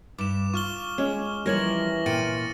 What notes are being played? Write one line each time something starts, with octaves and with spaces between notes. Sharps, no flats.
G2 D6 E7
F4 C#6 F6 G7
G#3 C#4
E3 F3 G3 A#4 C#5 A#6 F#7
A#2 G5 A6 C#7 D#7